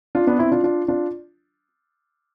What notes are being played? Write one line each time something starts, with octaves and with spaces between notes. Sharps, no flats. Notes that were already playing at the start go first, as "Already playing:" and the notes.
D4 F4
B3 D4
C4 E4
D4 F4
D4 F4
D4 F4